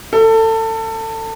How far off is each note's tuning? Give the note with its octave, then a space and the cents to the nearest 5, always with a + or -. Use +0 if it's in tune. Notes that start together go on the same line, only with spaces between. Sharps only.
A4 +25